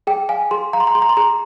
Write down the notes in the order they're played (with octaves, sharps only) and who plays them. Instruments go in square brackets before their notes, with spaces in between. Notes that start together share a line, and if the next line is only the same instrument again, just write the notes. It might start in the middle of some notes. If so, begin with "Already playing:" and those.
[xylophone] G#4 G5
F5 G#5
G#4 C6
F5 A#5
C6
A#5
G#4 C6
A#5
C6
G#4 A#5